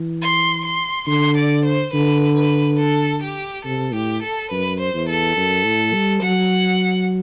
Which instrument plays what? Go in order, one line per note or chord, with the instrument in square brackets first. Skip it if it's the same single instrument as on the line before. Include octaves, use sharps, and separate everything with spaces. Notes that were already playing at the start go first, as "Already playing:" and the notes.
Already playing: [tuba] E3
[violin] C6
C6
[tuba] D3 [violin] C6
[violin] D5
C5
[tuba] D3 [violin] B4
[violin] B4
A4
G4
[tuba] C3 [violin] A4
[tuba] A2 [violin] G4
[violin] A4
[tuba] F#2 [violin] B4
[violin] C5
[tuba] E2
[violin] A4
[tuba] F#2
A2
G3
[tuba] F#3 [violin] F#5